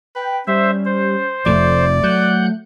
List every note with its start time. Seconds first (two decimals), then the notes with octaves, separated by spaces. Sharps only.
0.16 B4 G5
0.47 G3 C#4 C5 E5
0.85 C5
1.46 F1 F2 F3 A3 D5
2.03 F#3 F#5 F#6 G6